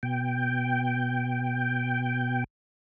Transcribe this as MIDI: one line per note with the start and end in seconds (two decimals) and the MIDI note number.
0.03 2.44 47
0.03 2.44 79